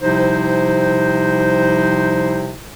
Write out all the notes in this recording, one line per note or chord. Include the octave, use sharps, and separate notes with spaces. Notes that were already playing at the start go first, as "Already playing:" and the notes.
C3 F3 G3 D#4 E4 C5